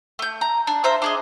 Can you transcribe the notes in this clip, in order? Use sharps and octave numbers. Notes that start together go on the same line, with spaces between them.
A3 G6
A#5
D4
F4 C5 E5 A#5
D4 G#4 D#5